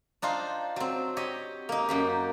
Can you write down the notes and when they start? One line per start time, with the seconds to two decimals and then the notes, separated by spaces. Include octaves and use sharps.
0.22 D4 D#4 F4 C5
0.76 F#3 C4
1.17 G4 C#5 D#5
1.69 A#3 D#4
1.89 F#2 A#3 G4